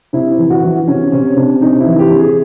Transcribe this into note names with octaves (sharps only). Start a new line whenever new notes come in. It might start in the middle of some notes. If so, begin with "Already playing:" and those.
C3 E4
E3
F#4
E3
C3 C#4
C3 C#4
C3 D4
C3 D#4
E4
E3
G4
C3
G#4